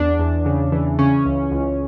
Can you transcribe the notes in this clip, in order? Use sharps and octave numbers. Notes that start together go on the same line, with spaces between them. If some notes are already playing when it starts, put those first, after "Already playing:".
Already playing: E2 D4
E2
C#3
E3
C#3 C#4
C#2
C#2